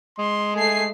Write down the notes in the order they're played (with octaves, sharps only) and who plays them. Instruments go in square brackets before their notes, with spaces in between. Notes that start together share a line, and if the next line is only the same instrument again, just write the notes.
[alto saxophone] G#3 [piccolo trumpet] C6
[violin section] A3 C7 [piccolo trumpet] G#5